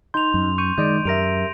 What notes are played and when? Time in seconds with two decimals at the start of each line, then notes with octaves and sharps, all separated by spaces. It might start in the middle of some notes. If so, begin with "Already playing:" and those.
0.14 D#4 C6 G6 F7
0.34 F#2
0.58 C#6 G6 D#7
0.78 D#3 G#3 D5 D#5 G6 D7
1.05 F#2 G4 A#4 E5 A#6 D7 F7